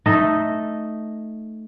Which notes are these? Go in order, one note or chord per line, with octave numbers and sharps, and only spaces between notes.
A3 D#4 D#5 E5